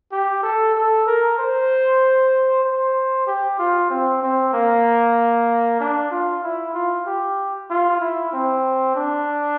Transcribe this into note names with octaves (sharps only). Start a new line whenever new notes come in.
G4
A4
A4
A#4
C5
C5
G4
F4
C4
C4
A#3
D4
F4
E4
F4
G4
F4
E4
C4
D4